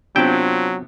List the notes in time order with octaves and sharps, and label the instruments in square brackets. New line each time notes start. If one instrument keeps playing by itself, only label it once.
[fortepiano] C3 B3 [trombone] F#3 [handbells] D4 F4 C5 [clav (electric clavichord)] G5